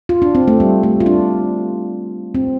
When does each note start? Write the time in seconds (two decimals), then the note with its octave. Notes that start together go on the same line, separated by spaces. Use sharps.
0.09 F4
0.22 D4
0.35 C4
0.48 A3
0.60 G3
0.83 A3
1.00 F4
1.06 D4
2.35 C4